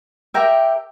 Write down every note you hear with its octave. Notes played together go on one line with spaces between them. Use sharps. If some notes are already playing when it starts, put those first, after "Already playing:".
G4 A#4 E5 G5